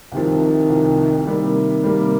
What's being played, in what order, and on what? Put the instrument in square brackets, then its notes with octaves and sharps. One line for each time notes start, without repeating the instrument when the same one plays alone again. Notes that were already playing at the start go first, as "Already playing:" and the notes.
[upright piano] C2 C3 F3 [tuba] D#3
[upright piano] C2 C3 F3
[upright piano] C3 G3 A#3 [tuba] D#3
[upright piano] C3 G3 A#3